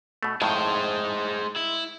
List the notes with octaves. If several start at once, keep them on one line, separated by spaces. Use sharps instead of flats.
B2 A3
F2 A2 D#3 G#3 C5
E4